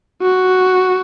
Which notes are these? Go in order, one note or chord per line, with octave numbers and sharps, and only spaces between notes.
F#4